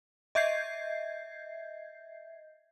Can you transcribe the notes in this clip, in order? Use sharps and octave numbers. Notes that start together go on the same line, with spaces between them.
D#5 E5 G6 G#6 C7